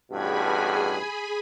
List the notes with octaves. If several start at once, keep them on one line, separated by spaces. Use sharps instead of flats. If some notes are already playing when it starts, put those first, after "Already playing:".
A1 G2 B2 G#4 G#5 B5